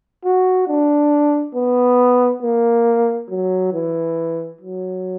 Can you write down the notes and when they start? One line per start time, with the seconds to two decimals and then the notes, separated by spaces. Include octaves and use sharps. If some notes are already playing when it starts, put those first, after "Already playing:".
0.25 F#4
0.68 D4
1.55 B3
2.43 A#3
3.29 F#3
3.73 E3
4.61 F#3